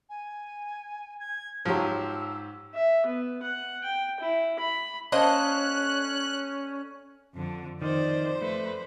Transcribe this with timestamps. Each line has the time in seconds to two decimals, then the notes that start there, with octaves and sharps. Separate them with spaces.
0.10 G#5
1.20 G#6
1.65 G#2 F3 F#3 G4 E6
2.74 E5
3.06 B3
3.42 F#5
3.84 G5
4.20 E4
4.59 B5
5.12 A#3 C#4 D4 A4 C5 D#5 F#6
7.35 F2 D3
7.82 F2 D#3 C5 D5
8.42 A3 B4